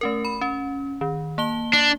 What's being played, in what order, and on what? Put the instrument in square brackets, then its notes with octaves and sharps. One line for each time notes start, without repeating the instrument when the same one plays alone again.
[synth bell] A3 C#4 A#4
B5
C#4
D#3
A#3 A5 G7
[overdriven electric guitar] D4